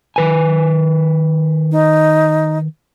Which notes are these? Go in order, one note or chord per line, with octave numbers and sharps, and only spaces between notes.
D#3 B4 G#5
D#4